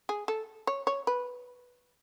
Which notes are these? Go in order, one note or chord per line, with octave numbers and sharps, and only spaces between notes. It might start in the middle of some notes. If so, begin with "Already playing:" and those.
G#4
A4
C#5
C#5
B4